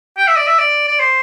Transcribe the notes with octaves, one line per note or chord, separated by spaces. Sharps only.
G5
E5
D5
E5
D5
D5
C5